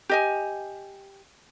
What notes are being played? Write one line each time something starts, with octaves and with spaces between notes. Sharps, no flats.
G4 D#5 G#5